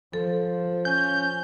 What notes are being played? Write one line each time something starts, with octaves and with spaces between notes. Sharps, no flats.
F3 A4
C#4 G6